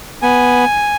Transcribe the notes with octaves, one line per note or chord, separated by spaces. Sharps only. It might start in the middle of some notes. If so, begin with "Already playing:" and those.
B3 G#5